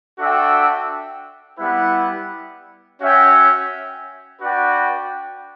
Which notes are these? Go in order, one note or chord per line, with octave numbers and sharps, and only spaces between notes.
D4 F#4 A4 E5 G5
G3 B3 E4 B4 F#5
C#4 F#4 C#5 E5 G5
D4 F#4 B4 D5 G5